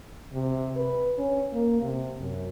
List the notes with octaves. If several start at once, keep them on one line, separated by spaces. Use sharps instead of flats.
C3
B4
C#4
A#3
C3
F#2